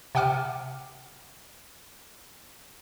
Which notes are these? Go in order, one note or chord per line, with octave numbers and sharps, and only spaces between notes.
C3 F#5 G5 D6 F6 D#7